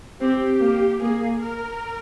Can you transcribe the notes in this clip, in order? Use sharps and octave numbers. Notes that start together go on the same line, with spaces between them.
C4 G4
A#3
A#3 G#4
A#4